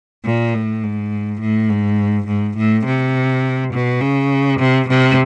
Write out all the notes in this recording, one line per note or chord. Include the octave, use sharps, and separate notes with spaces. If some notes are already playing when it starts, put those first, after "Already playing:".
A#2
A2
G#2
A2
G#2
G#2
A2
C3
B2
C#3
C3
C3